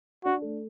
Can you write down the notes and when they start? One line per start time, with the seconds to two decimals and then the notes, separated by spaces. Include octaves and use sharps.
0.25 D4 F#4
0.42 A3